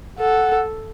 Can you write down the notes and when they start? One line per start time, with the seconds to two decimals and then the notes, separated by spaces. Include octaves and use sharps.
0.19 A4 F#5